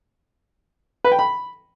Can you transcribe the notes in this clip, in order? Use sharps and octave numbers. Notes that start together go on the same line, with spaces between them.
B4
G5
B5